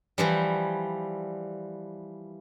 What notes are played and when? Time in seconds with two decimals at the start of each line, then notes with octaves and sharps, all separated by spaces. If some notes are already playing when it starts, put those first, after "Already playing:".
0.18 E3 F3 G3